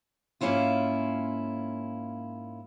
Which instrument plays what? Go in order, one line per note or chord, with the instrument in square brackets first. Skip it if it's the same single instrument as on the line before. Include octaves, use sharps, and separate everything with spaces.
[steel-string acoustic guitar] G#2 A#3 C#4 E4 F4